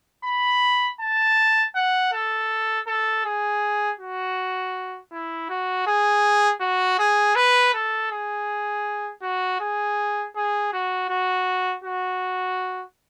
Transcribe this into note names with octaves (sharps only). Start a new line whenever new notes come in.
B5
A5
F#5
A4
A4
G#4
F#4
E4
F#4
G#4
F#4
G#4
B4
A4
G#4
F#4
G#4
G#4
F#4
F#4
F#4